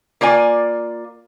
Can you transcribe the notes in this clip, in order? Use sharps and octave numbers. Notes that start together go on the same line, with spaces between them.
A#3 F4 D5 G#5